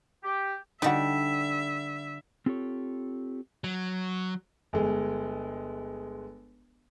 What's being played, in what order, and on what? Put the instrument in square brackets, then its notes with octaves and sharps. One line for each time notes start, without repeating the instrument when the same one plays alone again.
[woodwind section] G4
[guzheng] D3 G3 [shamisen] D#4 F#4 [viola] E5
[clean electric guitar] C4 F4 G4 A4 C#5
[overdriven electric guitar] F#3
[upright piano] G1 G#3